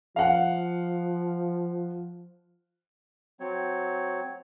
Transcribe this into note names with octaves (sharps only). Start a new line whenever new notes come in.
F3 F5 F#5
F#3 C4 C#5